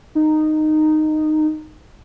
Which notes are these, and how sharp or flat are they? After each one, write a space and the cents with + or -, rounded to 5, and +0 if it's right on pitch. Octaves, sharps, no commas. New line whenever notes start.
D#4 -15